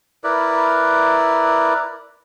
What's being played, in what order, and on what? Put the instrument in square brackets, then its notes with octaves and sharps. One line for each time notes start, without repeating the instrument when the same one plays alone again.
[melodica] E4 A#4 B4 D5